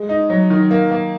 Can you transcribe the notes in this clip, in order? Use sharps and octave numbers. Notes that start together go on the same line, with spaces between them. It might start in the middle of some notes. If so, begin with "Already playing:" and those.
Already playing: G#3
D#4
F#3
D#3
A#3
A#3